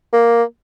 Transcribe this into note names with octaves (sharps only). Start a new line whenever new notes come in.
A#3